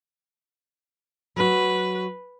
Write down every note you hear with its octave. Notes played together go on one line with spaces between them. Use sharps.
F#3 F#4 B4